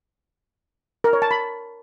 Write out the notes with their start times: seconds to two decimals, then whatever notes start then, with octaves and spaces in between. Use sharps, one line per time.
1.04 A#4
1.13 C#5
1.22 A5
1.31 B5